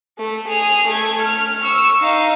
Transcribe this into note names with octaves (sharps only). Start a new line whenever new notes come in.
A3
G#4 F7
A3 G#6
F6
C#6 E6
D#4 F5